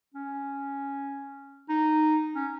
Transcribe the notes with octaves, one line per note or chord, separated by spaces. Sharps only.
C#4
D#4
C#4